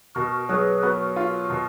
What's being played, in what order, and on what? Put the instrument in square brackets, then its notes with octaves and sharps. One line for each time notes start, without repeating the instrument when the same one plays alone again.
[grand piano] B2 [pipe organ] F#4 A#4
[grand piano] F#3 [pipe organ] G#4 B4
[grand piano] B3 [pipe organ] F#4 A#4
[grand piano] F4
B2